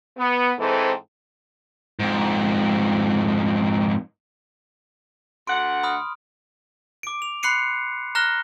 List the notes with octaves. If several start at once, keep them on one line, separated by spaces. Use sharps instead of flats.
B3
G#2 E3 C4 A4
F2 G#2
D2 F#5 C6 D7
B5 D#6 F6
D6 D7
F7
B5 C6 F#6 C7 C#7 D#7
A#5 F6 F#6 A#6 G7